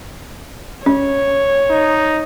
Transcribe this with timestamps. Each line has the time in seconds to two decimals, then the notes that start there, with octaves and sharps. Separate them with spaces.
0.86 C#4 C#5
1.70 D#4